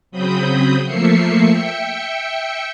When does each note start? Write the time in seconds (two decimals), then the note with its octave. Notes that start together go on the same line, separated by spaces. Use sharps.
0.11 C#3 F#3 C4 B5 D#6 G6
0.85 F3 A3 A#3 E5 C7 C#7
1.48 E5 G5 C#7